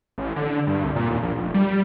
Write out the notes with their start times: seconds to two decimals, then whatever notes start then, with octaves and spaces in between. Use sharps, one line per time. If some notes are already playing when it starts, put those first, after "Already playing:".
0.18 A1
0.36 D3
0.67 G2
0.84 C2
0.96 A#2
1.11 D#2
1.22 A#1
1.38 F1
1.54 G3